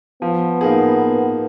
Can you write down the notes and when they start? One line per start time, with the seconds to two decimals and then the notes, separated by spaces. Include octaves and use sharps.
0.22 F3 B3
0.61 A#3 D#4 G#4